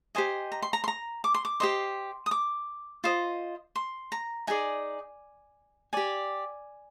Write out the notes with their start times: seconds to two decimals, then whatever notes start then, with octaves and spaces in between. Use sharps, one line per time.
0.15 G4 C5 D#5 G#5
0.52 A#5
0.62 C6
0.73 A#5
0.84 C6
0.88 A#5
1.24 D6
1.34 C6
1.45 D6
1.60 G4 C5 D#5 C6
2.26 D#6
2.31 D6
3.04 F4 C5 D#5
3.75 C6
4.12 A#5
4.47 D#4 G#4 D5 G#5
5.93 G4 D5 G#5